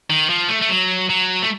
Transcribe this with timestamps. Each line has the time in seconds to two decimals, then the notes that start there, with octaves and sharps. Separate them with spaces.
0.10 D#3
0.29 F3
0.49 A3
0.61 A3
0.69 F#3
1.09 F#3
1.43 A3